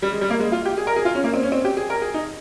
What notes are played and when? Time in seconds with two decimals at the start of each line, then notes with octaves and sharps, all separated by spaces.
0.02 G3
0.11 G#3
0.21 G3
0.30 A#3
0.40 G#3
0.52 F4
0.65 G4
0.77 G#4
0.87 A#4
0.96 G#4
1.05 F4
1.15 C#4
1.24 A#3
1.33 C4
1.43 C#4
1.52 C4
1.65 G4
1.77 G#4
1.90 A#4
2.02 G#4
2.14 D#4